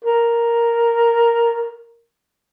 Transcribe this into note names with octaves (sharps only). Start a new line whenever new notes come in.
A#4